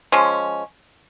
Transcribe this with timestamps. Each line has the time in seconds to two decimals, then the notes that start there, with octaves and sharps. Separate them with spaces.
0.12 F3 G#3 C#4